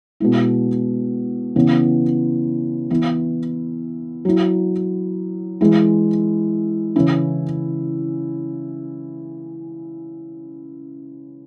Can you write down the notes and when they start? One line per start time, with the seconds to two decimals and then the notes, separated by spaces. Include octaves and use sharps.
0.20 B2 G#3 E4
1.56 C#3 E3 B3
2.90 E3 B3 E4
4.25 F#3 E4
5.61 E3 G#3 E4
6.96 C#3 E3 C#4 E4